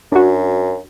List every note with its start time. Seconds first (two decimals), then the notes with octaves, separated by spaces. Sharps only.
0.12 F#2 D4 F#4